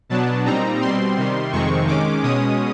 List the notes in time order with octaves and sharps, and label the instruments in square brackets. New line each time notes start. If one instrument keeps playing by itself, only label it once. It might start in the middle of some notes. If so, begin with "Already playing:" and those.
[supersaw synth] B2 F#3 B3 D4 A5
A#2 G3 C4 D#4 A#5
B2 G3 C4 C6
C3 D#3 G3
F2 C3 D#3 G#3 C4 C#6
D#3 G#3 C#4 D6
B2 G#3 C#4 D#6